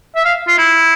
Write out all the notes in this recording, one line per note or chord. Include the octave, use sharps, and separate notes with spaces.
E5
F5
F4
E4